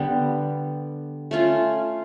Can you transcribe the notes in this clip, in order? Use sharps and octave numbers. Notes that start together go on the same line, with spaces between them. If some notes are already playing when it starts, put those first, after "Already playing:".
Already playing: D3 G3 B3
A3 C#4 F4